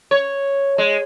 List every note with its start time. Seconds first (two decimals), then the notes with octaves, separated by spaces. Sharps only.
0.11 C#5
0.78 G#3